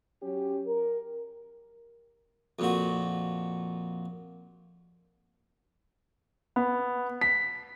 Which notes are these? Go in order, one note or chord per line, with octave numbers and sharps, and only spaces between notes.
F#3 C#4 G4
A#4
F2 A#2 F#4
B3
B6